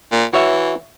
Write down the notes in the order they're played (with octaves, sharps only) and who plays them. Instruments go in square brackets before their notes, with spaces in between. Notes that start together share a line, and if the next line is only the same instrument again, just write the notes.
[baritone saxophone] A#2
[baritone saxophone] E3 [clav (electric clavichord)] F#4 C#5 E5